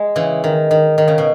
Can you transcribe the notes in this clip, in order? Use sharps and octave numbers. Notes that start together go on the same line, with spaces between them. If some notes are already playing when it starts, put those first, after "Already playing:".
Already playing: G#3
C#3 E3
D#3
D#3
D#3
C#3
B2